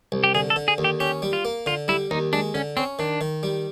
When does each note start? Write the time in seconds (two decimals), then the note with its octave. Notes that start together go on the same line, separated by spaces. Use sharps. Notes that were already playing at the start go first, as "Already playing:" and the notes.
0.12 C2
0.24 G4
0.35 D3 G#4
0.50 A4
0.56 D3
0.68 G#4
0.78 D#2
0.84 G4
1.00 C#4 G4
1.22 G3
1.33 F4
1.45 A#3
1.66 D3 F4
1.88 G3 E4
2.11 D#2 D#4
2.33 G#3 D4
2.54 D3 C#4
2.77 C4 C#4
2.99 D#3 D4
3.21 D#3
3.43 G3